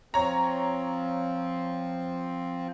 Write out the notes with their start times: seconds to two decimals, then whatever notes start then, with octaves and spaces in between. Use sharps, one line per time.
0.14 F3 C4 C#5 A#5